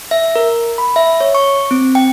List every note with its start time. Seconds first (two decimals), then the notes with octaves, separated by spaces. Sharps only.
0.11 E5
0.36 A#4
0.78 B5
0.96 E5
1.20 C#5
1.35 C#6
1.71 C4
1.95 G5